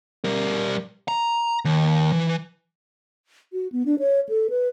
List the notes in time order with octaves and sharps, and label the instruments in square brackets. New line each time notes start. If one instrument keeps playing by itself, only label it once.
[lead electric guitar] G3 A#4
A#5
D#2
E3
[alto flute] F#4
B3
D4
C#5
A4
B4